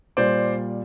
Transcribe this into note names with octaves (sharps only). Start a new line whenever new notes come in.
A#2 G3 C5 D5